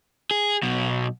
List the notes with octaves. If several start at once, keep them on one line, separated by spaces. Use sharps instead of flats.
G#4
B1 B2